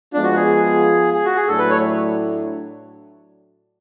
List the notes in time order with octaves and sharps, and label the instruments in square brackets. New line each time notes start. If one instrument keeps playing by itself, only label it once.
[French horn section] F3 G#3 B3 F4 [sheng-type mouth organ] D4
[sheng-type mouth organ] F#4
G#4
G#4
F#4
G#4
[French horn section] A2 F#3 A3 D4 [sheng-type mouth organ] A4
[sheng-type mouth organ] B4
C#5